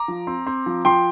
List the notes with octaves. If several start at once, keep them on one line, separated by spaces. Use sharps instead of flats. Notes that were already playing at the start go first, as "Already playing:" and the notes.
Already playing: A#5 D6
F3
C4
C4
F3
F3 G5 C6